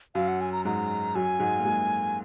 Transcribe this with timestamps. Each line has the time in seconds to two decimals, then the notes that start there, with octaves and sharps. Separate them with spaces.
0.15 F#2 F#3 F5
0.28 F#5
0.41 G#5
0.52 A#5
0.65 G#2 G#3 A#5
1.15 F#2 F#3 G#5
1.39 G#2 G#3
1.59 A#3
1.65 G#2 G#3